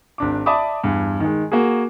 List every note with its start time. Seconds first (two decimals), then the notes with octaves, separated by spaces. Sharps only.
0.18 G#1 D4 D6
0.46 D5 E5 A5 B5 D6 D#6
0.84 E2 G2
1.20 D#3 G#3
1.52 A#3 F#4 G#4